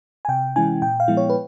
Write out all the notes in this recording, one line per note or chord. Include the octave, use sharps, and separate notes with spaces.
G#5
C3 G5
E3 G#3 C#4 E4 G#5
A#2 G5
F5
F3 G#3 B3 E4
C#5
B4